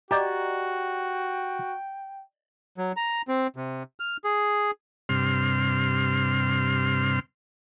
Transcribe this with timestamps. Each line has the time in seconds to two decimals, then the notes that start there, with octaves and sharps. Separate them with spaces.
0.11 F#4 G4 D5 D#5 G5 A#5
2.78 F#3
2.97 A#5
3.28 C4
3.56 C3
4.00 F6
4.24 G#4
5.09 G2 C3 C6 F6